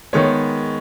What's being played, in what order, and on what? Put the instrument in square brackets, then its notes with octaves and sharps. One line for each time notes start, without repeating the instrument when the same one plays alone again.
[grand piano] D#3 G#3 B3 C#5